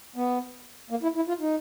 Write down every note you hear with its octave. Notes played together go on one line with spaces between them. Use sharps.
B3
A#3
E4
E4
F4
D#4